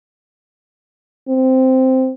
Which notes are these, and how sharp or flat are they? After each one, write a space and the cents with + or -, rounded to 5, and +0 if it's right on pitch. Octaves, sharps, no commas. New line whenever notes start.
C4 -5